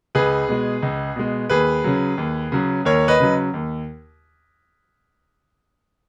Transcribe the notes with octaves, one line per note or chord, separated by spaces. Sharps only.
C#2 G#4 B4
B2 G#3
C#2
B2 G#3
D#2 G#4 B4
C#3 F#3
D#2
C#3 F#3
D#2 A#4 C#5
B4 D#5
C#3 F#3
D#2